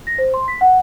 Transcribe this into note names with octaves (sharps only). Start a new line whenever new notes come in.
A#6
C5
C6
B6
F#5